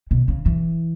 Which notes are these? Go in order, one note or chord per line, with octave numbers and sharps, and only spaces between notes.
B2
C#3
E3